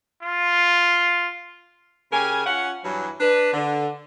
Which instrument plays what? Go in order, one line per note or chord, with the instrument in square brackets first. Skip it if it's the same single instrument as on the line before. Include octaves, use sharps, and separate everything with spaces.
[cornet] F4
[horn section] C#3 G4 A#4 G#5
C#4 F4 F#5
G2 E3 F#3
D4 B4
D3